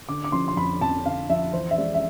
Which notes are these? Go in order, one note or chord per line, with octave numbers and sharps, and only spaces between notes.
D3 D6
D6
F3 C6
C6
F2 B5
F2 A5
D3 F5
F3 E5
E3 C5
E5
G#3 D5
E5